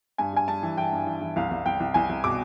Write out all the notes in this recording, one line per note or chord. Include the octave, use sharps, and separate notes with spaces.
G2 G#5
G2 G#5
G2 A5
E3
E3 G5
G2
E3
E3
C2 F5
C2
C2 G5
C2
C2 G#5
C2
B2 D6